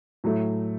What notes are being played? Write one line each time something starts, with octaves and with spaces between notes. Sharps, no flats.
A2 F#3 A3